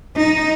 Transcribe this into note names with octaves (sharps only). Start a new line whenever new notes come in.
D#4